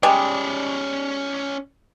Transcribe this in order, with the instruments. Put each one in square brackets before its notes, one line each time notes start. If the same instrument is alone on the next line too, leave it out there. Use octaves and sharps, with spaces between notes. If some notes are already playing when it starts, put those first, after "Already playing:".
[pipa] G3 G#3 [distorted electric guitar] C#4 D5